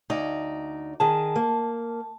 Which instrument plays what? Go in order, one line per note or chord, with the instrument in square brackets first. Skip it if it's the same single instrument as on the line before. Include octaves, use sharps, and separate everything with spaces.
[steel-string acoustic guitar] D2 D#4 D5
[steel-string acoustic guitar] D#3 G#4 [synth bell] A5
[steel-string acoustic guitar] A#3